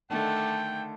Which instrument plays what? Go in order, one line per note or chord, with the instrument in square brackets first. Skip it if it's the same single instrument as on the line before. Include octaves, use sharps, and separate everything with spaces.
[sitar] D3 D#3 [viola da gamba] A3 [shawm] G5 [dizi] A5